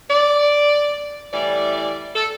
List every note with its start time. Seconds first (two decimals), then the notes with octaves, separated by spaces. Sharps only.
0.09 D5
1.31 A2 E3 G3 D5
2.15 A4